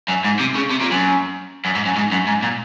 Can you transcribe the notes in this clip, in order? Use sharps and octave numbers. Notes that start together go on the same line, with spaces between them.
F#2
G#2
C3
C#3
C3
A#2
F#2
F#2
G#2
F#2
G#2
F#2
G#2
A#2